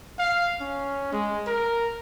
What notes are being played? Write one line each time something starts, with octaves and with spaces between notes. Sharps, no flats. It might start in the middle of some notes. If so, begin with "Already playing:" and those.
F5
C#4
G#3
A#4